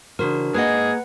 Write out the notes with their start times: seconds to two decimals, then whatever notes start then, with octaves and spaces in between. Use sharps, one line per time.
0.19 C#3 E3 D4 F#4 A#4 C5
0.54 G#2 A#3 G#4 B4 D#5 F#5